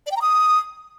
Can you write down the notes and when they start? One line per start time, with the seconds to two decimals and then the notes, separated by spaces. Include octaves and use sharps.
0.06 D5
0.11 G5
0.16 A#5
0.21 D#6